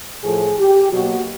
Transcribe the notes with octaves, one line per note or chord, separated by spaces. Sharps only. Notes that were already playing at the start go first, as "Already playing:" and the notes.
A2 F3 A3 G#4
G4
B2 F#3 A#3 F#4